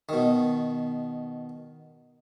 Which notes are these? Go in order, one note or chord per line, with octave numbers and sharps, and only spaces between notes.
B2 D#3